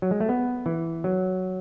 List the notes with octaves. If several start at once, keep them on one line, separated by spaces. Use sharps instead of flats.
F#3
G#3
A3
B3
E3
F#3